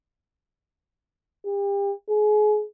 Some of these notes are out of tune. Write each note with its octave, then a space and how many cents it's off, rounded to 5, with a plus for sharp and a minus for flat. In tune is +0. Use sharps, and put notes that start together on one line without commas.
G4 +35
G#4 +30